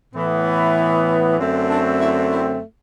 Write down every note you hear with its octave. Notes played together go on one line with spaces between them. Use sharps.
A2 E3 B3
F#2 D3 A3 C4
D4
E4
E4